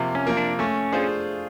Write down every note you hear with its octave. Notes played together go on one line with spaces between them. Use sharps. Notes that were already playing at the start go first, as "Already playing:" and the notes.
Already playing: C3 F3 A#3
C#4
F3 A#3
D4
A3 C#4
D4 F4 G#4 C5